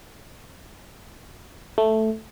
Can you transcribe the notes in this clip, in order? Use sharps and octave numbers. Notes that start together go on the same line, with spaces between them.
A3